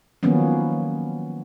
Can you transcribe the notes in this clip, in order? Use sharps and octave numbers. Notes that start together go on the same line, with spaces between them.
D#3 F3 F#3 A#3 B3 C#4